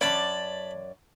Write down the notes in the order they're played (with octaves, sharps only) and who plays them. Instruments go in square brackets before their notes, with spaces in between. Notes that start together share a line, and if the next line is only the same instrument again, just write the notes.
[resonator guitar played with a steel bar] F#2 C#5 D5 [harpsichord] A5 B5